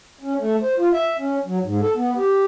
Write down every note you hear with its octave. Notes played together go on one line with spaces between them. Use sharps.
C#4
A3
C5
F4
E5
C#4
F#3
G#2
A4
B3
G4